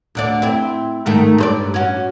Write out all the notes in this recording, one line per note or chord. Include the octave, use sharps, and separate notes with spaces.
D2 D3 D5
C4 E4
G#2 D#3 A3
G2 C5 D5
C#4 F#4